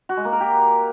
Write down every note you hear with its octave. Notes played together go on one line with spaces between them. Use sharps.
F#4
G#3
A#3
A#4
G4